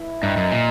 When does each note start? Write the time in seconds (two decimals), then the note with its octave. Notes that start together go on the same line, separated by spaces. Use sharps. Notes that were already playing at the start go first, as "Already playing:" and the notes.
Already playing: E4
0.22 G2 D#4
0.37 F#2
0.52 A#2